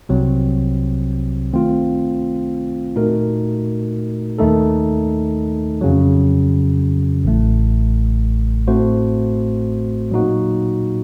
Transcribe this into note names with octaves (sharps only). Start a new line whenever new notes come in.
C2 C3 F#3 C4
D#3 A3 C4 F4
A#2 A3 D#4 F#4 A#4
D#2 D#3 A3 D#4 A4
F2 C#3 F#3
A1 A2 A3
A2 A3 C4 F#4 C5
A#2 F#3 A#3 D#4 F#4